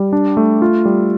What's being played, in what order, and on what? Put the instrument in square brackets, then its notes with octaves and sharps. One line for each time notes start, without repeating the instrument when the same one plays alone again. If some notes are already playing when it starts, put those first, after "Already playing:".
Already playing: [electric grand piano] G3
D4
A3
F4
G3